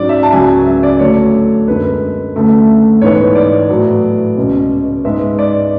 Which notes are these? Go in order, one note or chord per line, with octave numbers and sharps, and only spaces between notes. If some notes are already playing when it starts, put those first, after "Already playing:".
Already playing: G#2 F#3 C#4 D5
E5
A5
C#2 C#3 F#3 G#5
E5
D5
D2 D3 F#3 A3 C#5
F#2 D3 G#3 B4
D2 D3 A3 C#4
G#2 E3 B3 C#5
D5
A2 F#3 B3
C#2 B2 G#3 C#4
G#2 G#3 B3 E5
D5